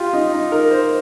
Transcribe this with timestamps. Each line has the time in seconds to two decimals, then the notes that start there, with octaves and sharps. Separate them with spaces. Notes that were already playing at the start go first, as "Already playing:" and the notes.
Already playing: F4 G4
0.13 D#4
0.33 D#4
0.52 A#4
0.71 C5